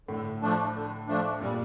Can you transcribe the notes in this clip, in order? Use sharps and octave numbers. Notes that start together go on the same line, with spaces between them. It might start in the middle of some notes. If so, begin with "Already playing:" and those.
A2 D3
F3 A3 D4
D3
F3 A3 D4
A#2 G3